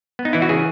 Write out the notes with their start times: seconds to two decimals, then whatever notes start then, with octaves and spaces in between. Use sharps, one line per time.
0.19 B3
0.25 D#4
0.33 E3 E4
0.42 F#4
0.49 C#3 G#4